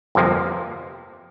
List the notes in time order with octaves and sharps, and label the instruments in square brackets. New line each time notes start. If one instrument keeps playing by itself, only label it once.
[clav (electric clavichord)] G1 F2 C3 F3 A#3